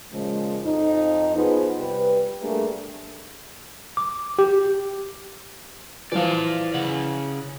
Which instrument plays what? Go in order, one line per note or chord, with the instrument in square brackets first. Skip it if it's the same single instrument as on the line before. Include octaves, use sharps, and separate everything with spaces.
[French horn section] A#2 C#3 F3 G#3
F2 D#4
F3 B3 F4 G#4 B4 C5
C3 G3 G4 B4
G3 A3 A#3 D4 G#4
[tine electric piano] D6
G4
[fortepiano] E3 F3 [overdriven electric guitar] D5 F5
[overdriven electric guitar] C#3 F#5